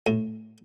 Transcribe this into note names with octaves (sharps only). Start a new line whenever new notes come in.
A2